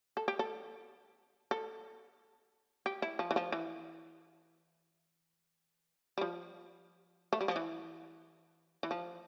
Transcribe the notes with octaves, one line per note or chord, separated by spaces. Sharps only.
A4
G4
A4
A4
G4
E4
F3
E3
F3
E3
G3
F3
A3
G3
F3
E3
E3
F3